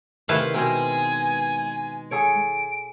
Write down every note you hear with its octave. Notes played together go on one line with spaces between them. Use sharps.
C3 D#3 A3 E4 B4 C5 F5
B2 G#3 C4 A#4 G#5
G#4 A4 C#5 D7